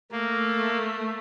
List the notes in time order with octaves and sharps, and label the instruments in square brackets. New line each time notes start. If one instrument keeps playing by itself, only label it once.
[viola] A3 [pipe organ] A#3